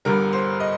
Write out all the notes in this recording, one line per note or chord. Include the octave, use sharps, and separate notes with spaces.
G1 G2 D3 G3 A#4
C5
D#5